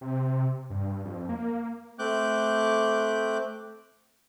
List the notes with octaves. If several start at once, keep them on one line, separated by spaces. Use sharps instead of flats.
C3
G2
F2
A#3
A3 C4 D6 F#6 G6